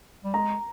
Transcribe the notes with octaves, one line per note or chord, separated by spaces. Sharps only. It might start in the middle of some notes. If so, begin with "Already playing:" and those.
G3
G#3 A#5